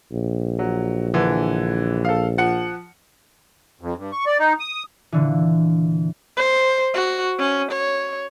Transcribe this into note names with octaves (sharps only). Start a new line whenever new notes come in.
A#1
F#3
D3 E3
A4 F5
F3 F#5 C#7
F2
G2
C#6
D5
D#4
D#6
A#2 D3 E3
C5
F#4
C#4
C#5